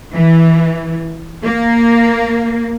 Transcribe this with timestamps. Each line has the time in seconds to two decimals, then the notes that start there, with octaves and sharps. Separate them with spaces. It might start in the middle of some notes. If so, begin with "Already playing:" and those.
0.13 E3
1.43 A#3